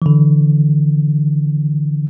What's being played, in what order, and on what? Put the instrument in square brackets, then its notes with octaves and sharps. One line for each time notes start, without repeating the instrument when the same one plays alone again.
[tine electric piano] D3 E3